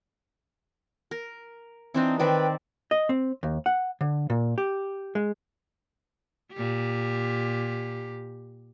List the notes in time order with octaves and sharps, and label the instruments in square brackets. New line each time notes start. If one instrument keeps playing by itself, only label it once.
[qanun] A#4
[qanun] E3 D4 D#4 [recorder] C4
[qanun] D#3 C4 D5 [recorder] B4
[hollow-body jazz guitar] D#5
C4
D#2
F#5
D3
A#2
G4
G#3
[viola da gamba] A#2 G4